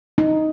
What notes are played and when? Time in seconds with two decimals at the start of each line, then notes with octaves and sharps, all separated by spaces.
0.18 D#4